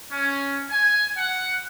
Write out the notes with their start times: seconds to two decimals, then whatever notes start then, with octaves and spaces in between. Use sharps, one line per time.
0.12 C#4
0.71 G#5
1.17 F#5